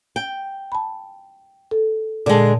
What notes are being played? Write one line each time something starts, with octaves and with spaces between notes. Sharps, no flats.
G5
A5 B5
A4
A#2 D3 G#3 A5